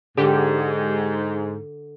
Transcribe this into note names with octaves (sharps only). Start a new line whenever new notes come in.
G#2 D3 G4